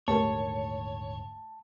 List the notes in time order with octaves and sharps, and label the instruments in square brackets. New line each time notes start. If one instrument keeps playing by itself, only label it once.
[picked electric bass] D#1 G#2 D3 [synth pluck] A3 G4 A#4 [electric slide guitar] C#5 [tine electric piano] A5